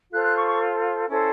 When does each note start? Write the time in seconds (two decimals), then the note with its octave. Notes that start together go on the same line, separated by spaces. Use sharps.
0.11 F4 A4 C5 F#6
0.23 F#6
0.35 C#6
0.47 C#6
1.07 C#4 E4 A4 C5